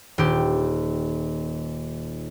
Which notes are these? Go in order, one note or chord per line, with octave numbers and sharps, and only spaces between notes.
D#1 G4